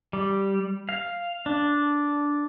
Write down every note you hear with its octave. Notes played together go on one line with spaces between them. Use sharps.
G3
F5
D4